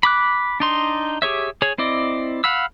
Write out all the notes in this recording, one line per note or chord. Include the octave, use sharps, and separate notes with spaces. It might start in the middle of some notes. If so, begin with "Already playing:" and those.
B5 D6 F#6
D4 D#4 C6
G4 G#4 C#5 E5
G#4 C#5
C4 E4 D5 D#5
F5 F#5 B5 E6